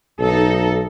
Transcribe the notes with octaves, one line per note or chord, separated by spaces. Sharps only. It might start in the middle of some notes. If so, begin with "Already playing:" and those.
B1 D#4 A4